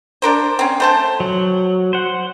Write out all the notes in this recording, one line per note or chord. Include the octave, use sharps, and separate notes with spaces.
D4 A#4 C5
C4 C#4
A3 C5 A5
F#3
C5 F#5